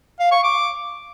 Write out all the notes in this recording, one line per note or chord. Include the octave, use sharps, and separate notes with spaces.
F5
C#6
D6